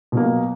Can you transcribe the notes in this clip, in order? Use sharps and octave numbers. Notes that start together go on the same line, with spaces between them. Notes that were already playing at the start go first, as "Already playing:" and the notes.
B2 F#3 A#3